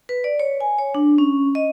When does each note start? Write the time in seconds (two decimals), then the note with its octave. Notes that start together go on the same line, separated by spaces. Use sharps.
0.09 B4
0.24 D5
0.40 C#5
0.61 G#5
0.78 C#5
0.95 D4
1.18 C#4
1.55 D#5